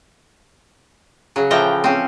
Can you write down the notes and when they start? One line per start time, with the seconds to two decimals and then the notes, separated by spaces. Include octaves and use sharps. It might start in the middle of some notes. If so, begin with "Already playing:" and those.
1.36 C#3 F#3
1.51 A2 E3 F3 G5 A#5
1.84 C4 C#4